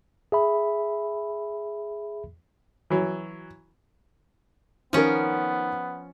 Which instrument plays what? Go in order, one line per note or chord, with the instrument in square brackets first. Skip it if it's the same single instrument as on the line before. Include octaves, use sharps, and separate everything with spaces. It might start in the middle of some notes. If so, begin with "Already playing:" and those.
[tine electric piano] G#4 E5 B5
[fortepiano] E3 F#3
[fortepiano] D#3 A#4 [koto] F3 C#4 [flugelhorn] B3